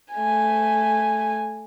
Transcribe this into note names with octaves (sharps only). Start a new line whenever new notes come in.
A3 G#5